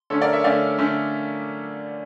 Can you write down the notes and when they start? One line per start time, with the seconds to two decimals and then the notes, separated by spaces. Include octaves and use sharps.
0.10 D3 A3 C#4 A4 C#5
0.22 A#4 D5
0.33 C#5 E5
0.44 D3 A3 C#4 D5 F5
0.79 D3 A3 C#4